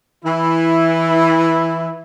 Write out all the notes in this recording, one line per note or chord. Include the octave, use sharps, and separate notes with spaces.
E3 E4